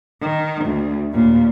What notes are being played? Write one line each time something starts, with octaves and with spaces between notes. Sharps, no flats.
D#3
D2
D#2 A#2